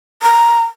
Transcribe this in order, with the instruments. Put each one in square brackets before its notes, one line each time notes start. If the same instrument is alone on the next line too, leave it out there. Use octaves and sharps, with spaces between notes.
[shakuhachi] A#5